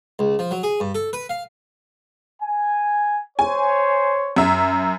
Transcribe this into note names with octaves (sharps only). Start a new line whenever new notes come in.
C#2
F3
F#3
G#4
G2
A4
B4
F5
G#5
C5 C#5 G#5
F#2 E5